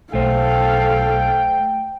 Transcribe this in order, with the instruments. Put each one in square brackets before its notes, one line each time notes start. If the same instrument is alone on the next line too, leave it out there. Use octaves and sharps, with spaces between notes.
[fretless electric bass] B1 [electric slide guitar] A3 C5 [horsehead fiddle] A4 F5 [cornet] G5